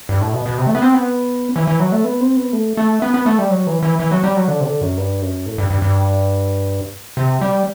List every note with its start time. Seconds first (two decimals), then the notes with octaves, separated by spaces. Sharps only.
0.09 G2
0.21 A2
0.34 B2
0.46 B2
0.58 C3
0.67 A3
0.75 B3
0.82 C4
0.94 B3
1.56 E3
1.67 E3
1.80 F#3
1.92 A3
2.04 B3
2.21 C4
2.36 B3
2.53 A3
2.77 A3
3.02 B3
3.14 B3
3.26 A3
3.39 G3
3.50 F#3
3.67 E3
3.83 E3
3.99 E3
4.12 F#3
4.24 G3
4.37 F#3
4.48 D3
4.61 C3
4.64 D3
4.81 F#2
4.97 G2
5.22 F#2
5.46 A2
5.58 G2
5.70 G2
5.82 G2
7.17 C3
7.41 G3